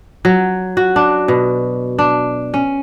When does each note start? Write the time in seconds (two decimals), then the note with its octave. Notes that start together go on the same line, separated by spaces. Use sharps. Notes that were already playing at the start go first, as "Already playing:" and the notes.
0.25 F#3
0.77 F#4
0.96 D4
1.28 B2
1.98 D4
2.54 C#4